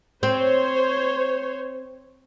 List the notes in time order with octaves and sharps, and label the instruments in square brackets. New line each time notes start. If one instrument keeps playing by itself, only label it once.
[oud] C4 [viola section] C5 C#5